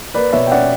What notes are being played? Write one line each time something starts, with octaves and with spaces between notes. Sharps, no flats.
A#3 B4 D5
B2 C#5 E5
G5
C#4 D5 F#5